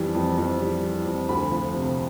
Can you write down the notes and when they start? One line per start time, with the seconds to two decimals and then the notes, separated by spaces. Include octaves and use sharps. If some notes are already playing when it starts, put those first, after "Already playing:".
Already playing: F2 E3 G3
0.15 F2
0.38 F2
0.61 G3
0.83 E3
1.06 F2
1.29 D2 B5
1.52 F3
1.74 C3